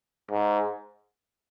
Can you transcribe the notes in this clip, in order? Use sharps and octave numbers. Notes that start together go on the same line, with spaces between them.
G#2